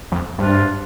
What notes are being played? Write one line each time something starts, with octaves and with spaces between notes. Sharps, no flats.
F2
G2 C3 G3 D4 F4